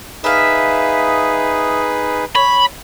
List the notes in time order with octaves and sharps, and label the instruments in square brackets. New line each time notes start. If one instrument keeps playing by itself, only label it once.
[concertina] D#4 G#4 B4 [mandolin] E5 F5
[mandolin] C#5 [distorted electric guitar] B5